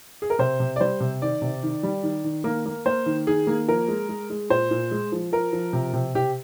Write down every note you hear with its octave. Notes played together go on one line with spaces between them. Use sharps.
G#4
A#4
C3 C5
C3
D5
G3 C5
C3
D#3 D5
C3
D#3
G3
D#3
D#3
A#3
A#3
A#3 C5
D#3
D#3 G#4
A#3
F3 A#4
G#3
G#3
G#3
A#2 C5
A#2
G#3
F3
F3 A#4
F3
C3
C3
C3 G4